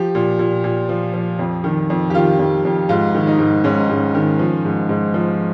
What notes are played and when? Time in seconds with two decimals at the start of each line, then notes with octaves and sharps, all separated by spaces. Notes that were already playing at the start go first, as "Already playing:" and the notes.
Already playing: F3 G4
0.15 A#2
0.39 A#2
0.64 A#2
0.89 F3
1.14 F3
1.39 F2
1.64 D#3
1.90 F2
2.10 G4
2.14 D#3 F4
2.39 F2
2.65 F2
2.89 G#2 F4
3.15 D#3
3.27 D#4
3.39 G#2
3.64 G#2 C#4
3.90 G#2
4.15 D#3
4.39 F3
4.65 G#2
4.89 G#2
5.14 F3